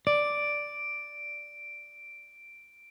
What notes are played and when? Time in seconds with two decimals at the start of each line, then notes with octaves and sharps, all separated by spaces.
0.07 D5 D7